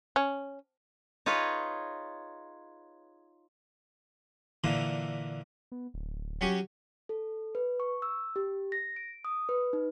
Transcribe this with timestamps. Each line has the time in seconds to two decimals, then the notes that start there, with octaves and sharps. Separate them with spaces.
0.16 C#4
1.26 D#4 F4 G#4 B4 C#5
4.64 A#2 D3 E3 A#3
5.72 B3
5.94 D1
6.41 F#3 C#4 G4
7.09 A4
7.55 B4
7.80 C#6
8.02 E6
8.36 G4
8.72 A#6
8.96 D7
9.25 D#6
9.49 B4
9.73 D#4